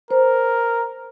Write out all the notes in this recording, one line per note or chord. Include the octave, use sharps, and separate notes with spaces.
A#4 C5